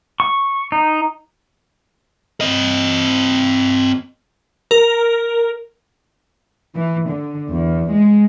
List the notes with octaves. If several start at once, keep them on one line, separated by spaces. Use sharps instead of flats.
C#6
D#4
C4 D#5
A#4
E3
D3
E2
G#3